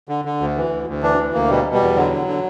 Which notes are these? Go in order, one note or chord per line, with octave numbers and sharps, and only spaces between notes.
D3
D3
D2
E3
D2
D2
E3 D4
D2
D2 A#3
B2 G3
B2
G3
E2
D3 F#3
D3
D3